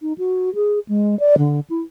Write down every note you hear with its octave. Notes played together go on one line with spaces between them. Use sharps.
D#4
F#4
G#4
G#3
D5
D3
E4